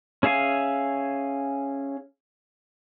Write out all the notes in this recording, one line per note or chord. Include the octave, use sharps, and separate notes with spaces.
C#4 G#4 E5 F5 G#5